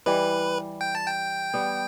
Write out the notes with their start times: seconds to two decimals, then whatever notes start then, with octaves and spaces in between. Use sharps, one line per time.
0.06 E3 G3 B4
0.81 G5
0.95 A5
1.08 G5
1.54 G3 B3